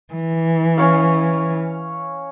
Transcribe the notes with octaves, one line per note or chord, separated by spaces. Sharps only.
E3
C#4 C#5 F5